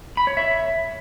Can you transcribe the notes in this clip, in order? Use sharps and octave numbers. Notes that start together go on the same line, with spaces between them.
B5
C#5
E5